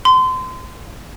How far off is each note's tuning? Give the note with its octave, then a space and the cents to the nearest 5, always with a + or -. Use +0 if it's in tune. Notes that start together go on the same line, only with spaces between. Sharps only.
C6 -30